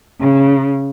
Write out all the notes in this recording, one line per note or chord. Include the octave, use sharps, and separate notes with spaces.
C#3